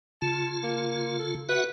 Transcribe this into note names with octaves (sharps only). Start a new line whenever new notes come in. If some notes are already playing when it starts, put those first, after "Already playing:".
C#3 F4 A5
A#3
A4
F#4 B4 E5 F#5